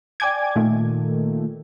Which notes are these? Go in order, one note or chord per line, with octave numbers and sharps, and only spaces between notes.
D5 G5 G#5 D6 G#6
A#2 D#3 A3